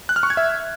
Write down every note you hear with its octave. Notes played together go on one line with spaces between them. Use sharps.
F#6
F6
C#6
G#6
E5